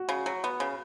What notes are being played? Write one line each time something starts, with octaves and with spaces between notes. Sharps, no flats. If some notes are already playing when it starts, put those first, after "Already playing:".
Already playing: F#4
C#3
F#3
B3
C#3